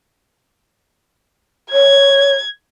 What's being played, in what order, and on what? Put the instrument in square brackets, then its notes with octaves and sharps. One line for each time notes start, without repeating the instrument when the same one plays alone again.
[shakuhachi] C#5 [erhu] G#6